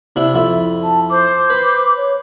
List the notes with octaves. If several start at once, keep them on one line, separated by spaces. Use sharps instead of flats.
C3 D4 E4
F2 E4
A5
C5 D6
B4
C#5